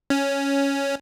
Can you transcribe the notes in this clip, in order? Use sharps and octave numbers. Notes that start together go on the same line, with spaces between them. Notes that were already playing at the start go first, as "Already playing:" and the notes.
C#4